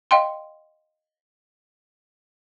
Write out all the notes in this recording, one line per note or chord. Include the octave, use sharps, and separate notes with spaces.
D#5 F5 G5 C6